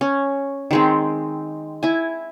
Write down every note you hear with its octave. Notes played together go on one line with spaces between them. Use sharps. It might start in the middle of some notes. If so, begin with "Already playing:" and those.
C#4
D#3 G#3 C4
E4 G#5